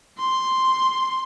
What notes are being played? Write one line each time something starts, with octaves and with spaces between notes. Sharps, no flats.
C6